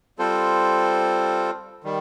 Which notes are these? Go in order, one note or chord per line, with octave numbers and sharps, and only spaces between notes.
G3 C4 F4 A4 C5
D#3 G3